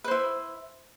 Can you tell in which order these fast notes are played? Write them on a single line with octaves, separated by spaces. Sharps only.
B4 C5 E4